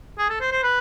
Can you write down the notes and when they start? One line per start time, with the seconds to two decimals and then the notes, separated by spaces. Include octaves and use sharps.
0.18 G#4
0.29 A4
0.40 C5
0.52 C5
0.63 B4